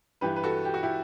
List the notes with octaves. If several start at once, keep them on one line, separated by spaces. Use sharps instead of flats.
G2 E3 G4 B4
B4
F#4 A4
G4
F#4
E4 G4